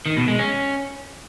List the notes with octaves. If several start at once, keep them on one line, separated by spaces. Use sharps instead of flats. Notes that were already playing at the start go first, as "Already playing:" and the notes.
D#3
B2
G#3
C#4